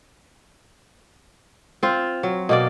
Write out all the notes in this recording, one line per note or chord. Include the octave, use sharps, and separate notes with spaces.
C4 F4
F#3
B2 A#3 D5